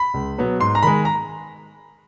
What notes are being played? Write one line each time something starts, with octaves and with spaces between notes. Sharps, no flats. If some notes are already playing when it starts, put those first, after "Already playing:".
Already playing: B5
C#2
B2 F#3 B3
G#2 C6
A#5
D#3 G#3 B5
A#5